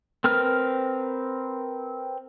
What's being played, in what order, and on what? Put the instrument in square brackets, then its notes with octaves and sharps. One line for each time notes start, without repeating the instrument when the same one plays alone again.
[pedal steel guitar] C4 A#4 B4 F6